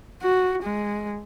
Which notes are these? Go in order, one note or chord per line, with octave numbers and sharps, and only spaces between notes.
F#4
G#3